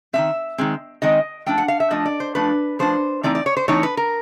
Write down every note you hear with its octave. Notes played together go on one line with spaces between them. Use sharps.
D#3 G#3 C4 E5
D#3 G#3 C4
D#3 G#3 C4 D#5
F3 A3 D4 G5
F#5
F5
E5
F3 A3 D4 D#5
D5
C5
F3 A3 D4 B4
F3 A3 D4 C5
E3 A3 C4 D#4 D5
D5
C#5
C5
E3 A3 C4 D#4 C#5
B4
A#4